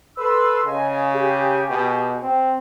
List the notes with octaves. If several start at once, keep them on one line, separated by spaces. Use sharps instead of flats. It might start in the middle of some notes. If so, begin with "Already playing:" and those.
A4 B4 C6 E6
C#3 D#5 G#5
G4 G#4
B2
C4